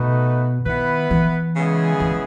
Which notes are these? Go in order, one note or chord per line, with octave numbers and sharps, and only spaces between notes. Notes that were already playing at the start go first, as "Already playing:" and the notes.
Already playing: B2 A3 D#4 F#4 B4
D#3 B3 E4 B4
E3
C#3 G#3 B3 E4 G#4
E3